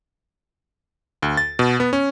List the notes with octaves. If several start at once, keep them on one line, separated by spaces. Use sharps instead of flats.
D2
A6
B2
B3
C#4